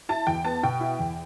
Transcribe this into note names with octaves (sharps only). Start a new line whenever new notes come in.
E4 A5
E2 G5
B3 A5
B2 G5
E4
E2